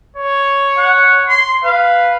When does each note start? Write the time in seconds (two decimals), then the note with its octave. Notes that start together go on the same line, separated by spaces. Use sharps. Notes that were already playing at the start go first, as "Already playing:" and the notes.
0.17 C#5
0.78 F#5
1.29 C6
1.64 B4 F5